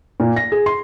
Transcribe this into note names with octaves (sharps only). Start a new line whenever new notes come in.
A#2
A#6
G#4
C6